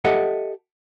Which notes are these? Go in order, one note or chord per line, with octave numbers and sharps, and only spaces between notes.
G4 A4 D#5 E5 F#5